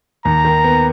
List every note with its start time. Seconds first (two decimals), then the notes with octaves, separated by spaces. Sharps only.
0.25 D#2 A#5
0.45 D#3
0.64 B3